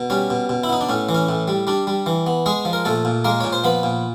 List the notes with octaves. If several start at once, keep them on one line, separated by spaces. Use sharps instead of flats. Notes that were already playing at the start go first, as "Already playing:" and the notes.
Already playing: B2
G3 C#4
B2
B2
E4
B3 D#4
D4
A2 C#4
E3
C#4
A2
G3
G3 D4
G3
E3
B3
G#3 G#4
F3
A#4
A#2 A3 A4
A#2
G#3 A#3 A#4
A#2 C#5
C5
F3 B3 B4
A#2